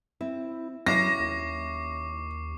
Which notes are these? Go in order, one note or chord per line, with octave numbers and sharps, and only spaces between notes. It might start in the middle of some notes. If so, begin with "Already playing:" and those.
C4 E4
F#3 C#4 E4 C#6 D6 A#6 C7
D#2